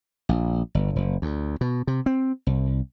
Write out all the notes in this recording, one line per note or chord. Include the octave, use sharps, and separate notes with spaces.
A#1
G1
F#1
D2
B2
C3
C4
C2